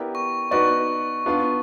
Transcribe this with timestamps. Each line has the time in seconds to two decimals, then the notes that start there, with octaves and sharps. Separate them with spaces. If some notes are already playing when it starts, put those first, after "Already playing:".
Already playing: B3 E4 G4 A#4 D5
0.15 C#6
0.51 B3 D#4 F#4 B4 D5 C#6
1.26 B3 D4 F4